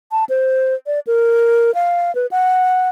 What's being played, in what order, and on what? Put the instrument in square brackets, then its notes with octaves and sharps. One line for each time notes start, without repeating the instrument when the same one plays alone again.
[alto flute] A5
C5
D5
A#4
F5
B4
F#5